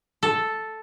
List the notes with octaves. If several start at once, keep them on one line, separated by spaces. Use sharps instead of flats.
A4